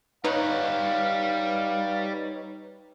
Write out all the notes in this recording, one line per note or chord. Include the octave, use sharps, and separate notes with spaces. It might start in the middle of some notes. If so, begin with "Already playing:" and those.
G3 D#4 B4 C#5 F5 F#5